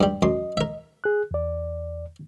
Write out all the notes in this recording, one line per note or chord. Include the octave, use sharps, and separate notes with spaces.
G2 G3
F#2 D#5 C6
A#4 E5
G#4 F#6
E2 D5